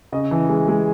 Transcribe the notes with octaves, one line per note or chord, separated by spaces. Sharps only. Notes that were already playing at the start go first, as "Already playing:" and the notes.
C#3 D#5
E3
G#3
G#3